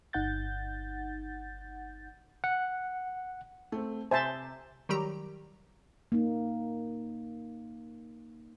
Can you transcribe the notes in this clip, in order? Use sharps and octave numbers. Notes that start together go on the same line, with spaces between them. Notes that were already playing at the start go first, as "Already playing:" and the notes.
G1 D#4 F#5 G6 A6
F#5
A3 C4
C3 C5 E5 G#5 A5
D#3 F#3 G3 G4 A#5
A#3 D#4